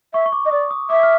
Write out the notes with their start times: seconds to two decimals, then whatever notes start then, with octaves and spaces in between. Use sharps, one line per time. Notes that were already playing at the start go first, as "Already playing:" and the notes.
0.14 E5 C#6
0.26 C#6
0.32 D6
0.46 D#5
0.51 D5 D#6
0.71 D#6
0.90 E5 D6
1.03 F6